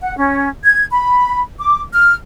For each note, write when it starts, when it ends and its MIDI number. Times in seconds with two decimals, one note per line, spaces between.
0.01 0.15 78
0.18 0.48 61
0.64 0.86 92
0.91 1.41 83
1.59 1.82 86
1.92 2.15 89